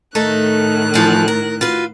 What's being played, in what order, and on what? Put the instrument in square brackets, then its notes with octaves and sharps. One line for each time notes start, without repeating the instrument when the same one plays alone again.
[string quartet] A2 D#3 F#6 [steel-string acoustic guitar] A3 D#4 A4
[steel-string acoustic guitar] E3 F3 A4
A#4
F4 F#4 B4